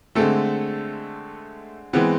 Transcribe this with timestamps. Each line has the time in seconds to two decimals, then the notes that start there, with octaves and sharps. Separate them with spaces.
0.15 D3 G#3 A3 C4 A4
1.93 E3 G#3 B3 C4 B4